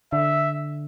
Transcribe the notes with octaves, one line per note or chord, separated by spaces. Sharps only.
D3 E5